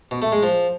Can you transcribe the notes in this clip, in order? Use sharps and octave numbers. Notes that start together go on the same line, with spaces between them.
B2
A3
G#3
F3